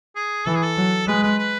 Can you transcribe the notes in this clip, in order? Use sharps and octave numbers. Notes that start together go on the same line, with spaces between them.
G#4
E3 A4
G#4
A4
F#3
G#3 B4
B4
B4